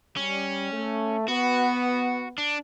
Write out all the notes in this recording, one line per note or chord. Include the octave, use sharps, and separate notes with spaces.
G3 C#4
A3
B3 F#4
D4